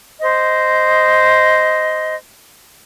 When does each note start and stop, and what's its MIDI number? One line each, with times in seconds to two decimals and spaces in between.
0.20 2.15 72
0.20 2.15 75